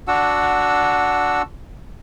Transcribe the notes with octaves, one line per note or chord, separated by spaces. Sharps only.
D4 F#4 F#5 E6